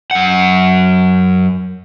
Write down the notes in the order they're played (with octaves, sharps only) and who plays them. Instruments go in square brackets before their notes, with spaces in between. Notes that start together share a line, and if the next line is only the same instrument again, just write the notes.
[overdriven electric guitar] F#2 F#5